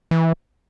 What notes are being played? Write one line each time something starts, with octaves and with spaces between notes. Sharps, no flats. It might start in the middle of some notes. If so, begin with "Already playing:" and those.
E3